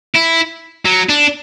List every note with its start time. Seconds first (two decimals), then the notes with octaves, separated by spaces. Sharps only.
0.15 E4
0.85 F#3
1.09 D4